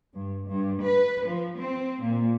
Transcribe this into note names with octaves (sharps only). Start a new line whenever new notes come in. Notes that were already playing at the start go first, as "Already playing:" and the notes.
G2
G2
B4
F3
C4
A#2